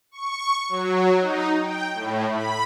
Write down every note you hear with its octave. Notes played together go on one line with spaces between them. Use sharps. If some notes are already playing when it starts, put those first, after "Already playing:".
C#6
F#3
D#4
G5
A2
B5